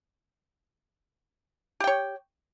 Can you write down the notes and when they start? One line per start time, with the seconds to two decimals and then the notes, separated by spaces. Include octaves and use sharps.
1.80 G4
1.84 G5
1.87 C#5